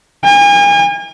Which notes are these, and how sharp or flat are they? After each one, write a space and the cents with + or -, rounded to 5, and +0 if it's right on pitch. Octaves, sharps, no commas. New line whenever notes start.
G#5 -40